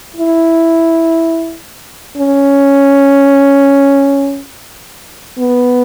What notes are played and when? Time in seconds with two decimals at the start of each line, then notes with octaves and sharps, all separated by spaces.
0.16 E4
2.17 C#4
5.39 B3